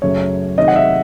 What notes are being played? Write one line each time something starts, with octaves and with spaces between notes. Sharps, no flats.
F#2 C#3 F#3 A3 C#5
C3 D#3 F#3 A3 D#5
F#5
E5